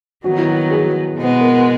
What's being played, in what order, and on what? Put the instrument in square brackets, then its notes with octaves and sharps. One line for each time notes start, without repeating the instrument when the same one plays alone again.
[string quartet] D#3 F#3 B3 [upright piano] F#4
[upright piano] E4
F#4
G#4
[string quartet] B2 G#3 B3
[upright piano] A#4